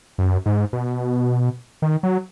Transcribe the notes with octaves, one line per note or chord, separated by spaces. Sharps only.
F#2
G#2
B2
D#3
F#3